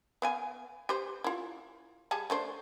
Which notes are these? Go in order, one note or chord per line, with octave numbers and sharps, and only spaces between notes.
B3 F5 G#5
G4 B4 C5
E4 F4
G3 G#4 A5
A3 D4 C5